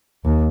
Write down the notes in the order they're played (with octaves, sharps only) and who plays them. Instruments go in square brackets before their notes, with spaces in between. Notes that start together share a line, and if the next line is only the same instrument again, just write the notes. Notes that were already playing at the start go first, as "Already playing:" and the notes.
[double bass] D#2